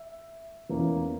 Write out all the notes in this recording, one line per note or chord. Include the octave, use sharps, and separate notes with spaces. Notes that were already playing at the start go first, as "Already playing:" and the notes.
Already playing: E5
E2 E3 A#3 C#4